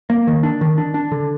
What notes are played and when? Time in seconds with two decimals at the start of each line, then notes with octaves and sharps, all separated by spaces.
0.10 A#3
0.27 D#3
0.43 D4
0.61 D#3
0.78 D4
0.94 D4
1.12 D3